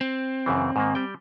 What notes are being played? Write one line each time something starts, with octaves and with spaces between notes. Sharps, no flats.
C4
F#2 C#3 E3
G#2 D#3 A#3
G3 G5